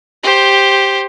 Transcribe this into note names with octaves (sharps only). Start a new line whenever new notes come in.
G4 C5